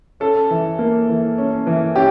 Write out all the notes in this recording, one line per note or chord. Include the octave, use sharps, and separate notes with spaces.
C#4 A4
E3
A#3
E3
C#4
E3
C#4 G4